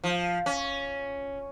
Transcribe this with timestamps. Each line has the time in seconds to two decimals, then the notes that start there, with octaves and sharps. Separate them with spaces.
0.04 F3
0.46 C#4